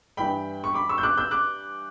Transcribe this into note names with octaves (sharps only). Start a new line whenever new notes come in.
G2 E3 G5 B5
C#6
B5 D6
C#6 E6
G6
D6 F#6
E6 G6
D6 F#6